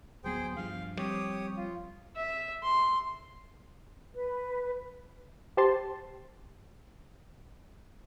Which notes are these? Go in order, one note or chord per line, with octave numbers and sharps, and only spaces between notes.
D1 F#3 B3 G#4 C5 G5
G2 F3 F5
F3 G3 C4 G4 C#5 D#6
F4
E5
C6
B4
G4 C5 A5 C6